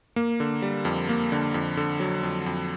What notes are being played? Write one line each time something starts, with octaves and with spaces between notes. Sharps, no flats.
A#3
D3
G3
F2
A#3
D3
F2
D3
F#3
F2
F2